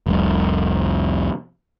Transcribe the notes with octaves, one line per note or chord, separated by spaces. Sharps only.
F1 C2